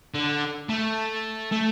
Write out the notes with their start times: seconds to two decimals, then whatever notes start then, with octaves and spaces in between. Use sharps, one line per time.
0.14 D3
0.69 A3
1.52 A3